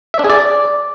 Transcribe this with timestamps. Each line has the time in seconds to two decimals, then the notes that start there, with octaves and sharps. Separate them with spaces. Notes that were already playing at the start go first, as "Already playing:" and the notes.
0.14 E5
0.19 D4
0.24 G#4
0.30 D5